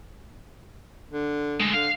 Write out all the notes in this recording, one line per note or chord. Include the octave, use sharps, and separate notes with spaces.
D3
G#3 A3
D3 F5